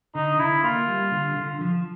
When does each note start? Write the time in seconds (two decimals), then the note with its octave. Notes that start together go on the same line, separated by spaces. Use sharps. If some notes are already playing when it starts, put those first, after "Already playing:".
0.15 D3 D#4
0.39 D3 E4
0.63 A#3 F4
0.88 G3
1.12 D3
1.36 D3
1.61 F3